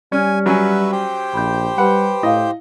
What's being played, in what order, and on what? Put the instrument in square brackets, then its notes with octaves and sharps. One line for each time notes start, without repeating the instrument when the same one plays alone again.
[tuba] G3 [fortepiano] C#4 [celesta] D5 F6 [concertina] G#5
[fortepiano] F#3 C#4 G#5 [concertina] F#4 B4 E5
[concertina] G4 C5 G5
[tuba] A#1 [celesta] B5 G6
[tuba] G3 [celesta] B4 B5 [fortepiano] F#5
[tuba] A2 [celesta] E4 F5 [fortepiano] D#5